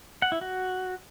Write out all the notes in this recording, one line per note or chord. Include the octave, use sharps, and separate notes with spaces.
F#5
E4
F#4